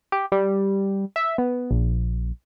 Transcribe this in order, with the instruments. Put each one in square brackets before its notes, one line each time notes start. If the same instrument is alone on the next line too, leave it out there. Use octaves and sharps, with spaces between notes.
[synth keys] G4
G3
E5
B3
A#1